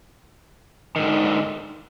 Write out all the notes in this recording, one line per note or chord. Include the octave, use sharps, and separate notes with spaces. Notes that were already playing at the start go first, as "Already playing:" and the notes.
G#2 D3 D#3